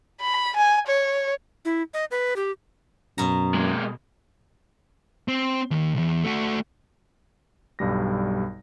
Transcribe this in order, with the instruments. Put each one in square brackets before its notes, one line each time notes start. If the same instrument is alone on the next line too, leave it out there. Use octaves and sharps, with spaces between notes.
[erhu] B5
G#5
C#5
[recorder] E4
D#5
B4
G4
[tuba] F#2 [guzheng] B2 A#5
[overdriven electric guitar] G#3 A#3
[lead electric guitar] C4
D#2
B1 E2
A3 F#4
[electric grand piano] B1 G2 G3 A#6